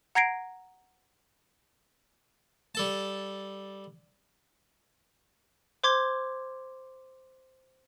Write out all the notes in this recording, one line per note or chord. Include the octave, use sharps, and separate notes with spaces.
F#5 A#5 G#6 A#6 C7 D7
G3 A4 A5
C5 C6 D6 G#6